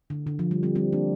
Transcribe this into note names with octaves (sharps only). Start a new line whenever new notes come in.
D3
D3
F3
G3
G3 C4
G3 C4
A#3 D4